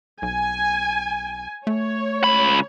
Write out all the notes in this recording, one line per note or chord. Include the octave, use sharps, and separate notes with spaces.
B1 G#5
A3 C#5
C#2 B5